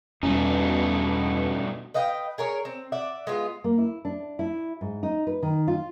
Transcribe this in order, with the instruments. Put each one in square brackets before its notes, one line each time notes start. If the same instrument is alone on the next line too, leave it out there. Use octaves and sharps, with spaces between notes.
[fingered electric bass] E2 G3 [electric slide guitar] G2 A3 D#4 [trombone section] B2 [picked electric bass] C#4
[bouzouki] B4 D#5 F5 G5
G#4 A#4 C#5
C4
D5 E5 F#5
G#3 B3 F4
[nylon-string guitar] A#3
E4
D4
E4
G#2
D#4
B4
D#3
F4